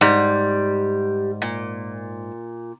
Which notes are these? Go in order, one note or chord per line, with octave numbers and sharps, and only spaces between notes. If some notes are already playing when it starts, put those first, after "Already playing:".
G#2 G3
A#2